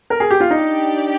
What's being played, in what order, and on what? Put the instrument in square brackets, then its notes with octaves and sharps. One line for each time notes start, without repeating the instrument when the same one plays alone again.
[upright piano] A#4
G#4
G4
F4
[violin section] D4 G4 D5 G5 [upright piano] D#4